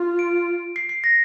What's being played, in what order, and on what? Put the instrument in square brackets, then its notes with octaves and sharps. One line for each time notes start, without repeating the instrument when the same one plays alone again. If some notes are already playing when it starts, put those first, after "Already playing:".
Already playing: [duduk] F4
[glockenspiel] D7
C7
C7
A#6